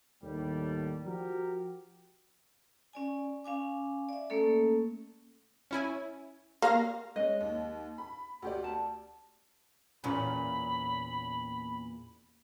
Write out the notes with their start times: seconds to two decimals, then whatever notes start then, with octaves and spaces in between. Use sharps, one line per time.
0.23 D#2 A2 G3
1.04 F3 F#4 G4 A#4
2.93 C#4 D5 G#5
3.44 C#4 F5 G#5 D6
4.09 D5 E5
4.30 A3 A#3 C#4 A4
5.71 C#4 E4 G#5
6.62 A#3 F5 A#6
7.16 G#3 C#4 D#5
7.40 D#2
7.98 B5
8.42 D2 G4 D5
8.64 A5
10.04 E2 A#2 C#4 B5